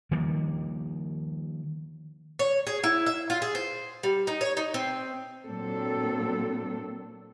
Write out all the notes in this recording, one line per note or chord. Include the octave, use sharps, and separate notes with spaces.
D#3 F3 G3 A#3
C#5
G#4
E4
E5
F4
G#4
C5
G3
D#4
C#5
D#4
C4
A#2 F#3 A#3 C4 D4 A4